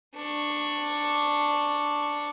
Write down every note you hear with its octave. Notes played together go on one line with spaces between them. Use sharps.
D4 C#6